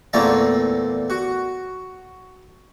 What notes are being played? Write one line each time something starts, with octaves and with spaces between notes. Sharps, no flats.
E2 A#2 A3 C4 A5 A#5
F#4